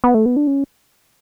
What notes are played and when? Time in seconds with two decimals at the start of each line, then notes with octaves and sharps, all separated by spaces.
0.04 B3
0.14 A3
0.26 B3
0.36 D4
0.47 C#4